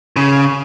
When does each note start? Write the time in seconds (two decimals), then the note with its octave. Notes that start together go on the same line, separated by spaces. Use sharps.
0.16 C#3